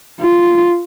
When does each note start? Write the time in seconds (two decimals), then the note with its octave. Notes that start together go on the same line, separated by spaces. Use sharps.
0.21 F4